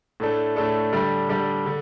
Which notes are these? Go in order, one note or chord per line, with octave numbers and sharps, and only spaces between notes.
A2 A3 D4 A4
A2 A3 D4 A4
D3 G3 D4 G4 D5
D3 G3 D4 G4 D5
D3